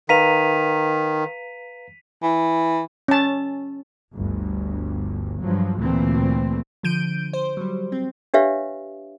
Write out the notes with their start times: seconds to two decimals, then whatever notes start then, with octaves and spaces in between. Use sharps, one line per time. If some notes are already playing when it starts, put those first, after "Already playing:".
0.09 D#3 B4 F5 A#5 B6 D#7 F7
2.22 E3
3.08 C#4 A5
4.13 G1 D2 G2
5.39 G2 F3 F#3
5.78 D2 A#2 E3 A3 C4
6.83 D3 F3 G6 D7 D#7
7.33 C5
7.57 F#3 G3
7.92 C4
8.34 D4 G4 B4 C#5 E5 F5